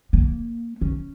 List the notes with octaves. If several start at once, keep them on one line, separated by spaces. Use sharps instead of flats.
A#3
C#4